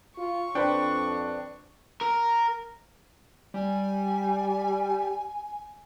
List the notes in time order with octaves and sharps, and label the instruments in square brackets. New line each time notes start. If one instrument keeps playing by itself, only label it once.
[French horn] F4 [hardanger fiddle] C#6
[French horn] F2 [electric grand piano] D4 [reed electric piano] B4 C5 G5
[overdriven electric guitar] A#4
[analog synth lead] G3 [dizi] G#5